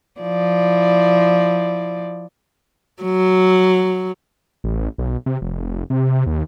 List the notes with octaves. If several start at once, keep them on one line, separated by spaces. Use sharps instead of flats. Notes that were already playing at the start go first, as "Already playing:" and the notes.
F3 E4 D5
F#3
A1
B1
C3
F1
C3
D#2